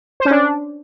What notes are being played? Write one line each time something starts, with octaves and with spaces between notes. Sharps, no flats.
C5
C#4
D4